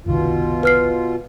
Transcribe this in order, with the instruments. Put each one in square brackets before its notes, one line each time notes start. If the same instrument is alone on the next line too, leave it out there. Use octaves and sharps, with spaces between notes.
[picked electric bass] F#1 C2 D#3 [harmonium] B2 F4
[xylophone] B4 F6 C7